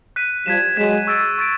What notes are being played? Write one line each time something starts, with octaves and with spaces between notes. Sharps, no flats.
F#6 B6 D#7
F3 G3 G#6 B6 E7
F#3 G#3 G#6 B6 E7
C#6 E6 A6 D7
C#6 E6 A6 D7